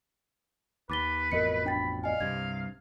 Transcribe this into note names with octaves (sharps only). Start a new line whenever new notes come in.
D#2 B4 D6 A6 G7
A1 F2 B2 A#4 D#5 C#7
D4 G5 B5 A6
D5 D#5 F5 G#5
C2 G2 C3 G#6